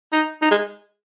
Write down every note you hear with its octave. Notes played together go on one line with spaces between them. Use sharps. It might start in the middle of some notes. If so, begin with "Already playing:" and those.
D#4
D#4
G#3